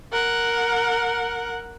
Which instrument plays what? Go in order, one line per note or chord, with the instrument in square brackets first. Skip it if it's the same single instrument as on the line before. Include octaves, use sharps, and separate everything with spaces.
[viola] A#4 F#5